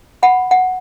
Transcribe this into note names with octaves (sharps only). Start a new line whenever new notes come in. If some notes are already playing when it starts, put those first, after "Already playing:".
F#5 B5
F#5